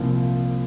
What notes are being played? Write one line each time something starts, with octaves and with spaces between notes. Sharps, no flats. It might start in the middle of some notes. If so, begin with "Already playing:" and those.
Already playing: C2 A#2 F3